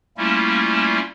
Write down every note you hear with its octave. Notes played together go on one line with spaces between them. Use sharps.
G3 A3 A#3 C#4 E4 F4